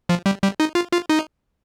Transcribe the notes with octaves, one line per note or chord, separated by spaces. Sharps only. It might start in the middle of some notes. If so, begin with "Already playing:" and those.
F3
G3
G3
D#4
F4
F4
D#4